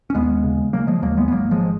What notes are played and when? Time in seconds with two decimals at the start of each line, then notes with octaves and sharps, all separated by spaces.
0.10 C#4
0.15 D#2 G#3 B3
0.44 C#3
0.73 C#3 F#3 A#3
0.87 F3 G#3
1.02 D#2 F#3 A#3
1.17 G#3 B3
1.28 B3
1.32 G#1 F#3 A#3
1.51 F3 G#3